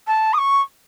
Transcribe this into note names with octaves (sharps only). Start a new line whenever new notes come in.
A5
D#6
C#6